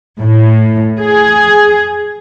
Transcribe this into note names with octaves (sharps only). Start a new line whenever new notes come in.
A2
G#4